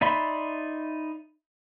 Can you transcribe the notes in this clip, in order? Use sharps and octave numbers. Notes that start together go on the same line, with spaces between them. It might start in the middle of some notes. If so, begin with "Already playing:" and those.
D#4 D5 E5 B5 C6